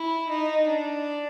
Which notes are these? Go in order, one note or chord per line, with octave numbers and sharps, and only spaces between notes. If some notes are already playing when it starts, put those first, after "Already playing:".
Already playing: E4
D#4
D4